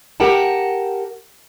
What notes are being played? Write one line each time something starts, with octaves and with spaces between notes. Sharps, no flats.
G4 A#4 F#5 G5 A5